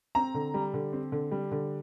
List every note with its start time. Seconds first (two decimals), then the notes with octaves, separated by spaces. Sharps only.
0.15 C4 A#5
0.34 D3
0.54 G3
0.74 D3
0.93 C4
1.12 D3
1.31 G3
1.52 D3